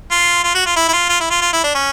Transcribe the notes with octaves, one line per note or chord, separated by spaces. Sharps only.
F4
F4
F#4
F4
E4
E4
F4
F4
E4
F4
F4
E4
D4
C#4